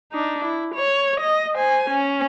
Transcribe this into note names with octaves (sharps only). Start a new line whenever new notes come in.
D4 D#4
E4
C#5
D#5
C5 G#5
C#4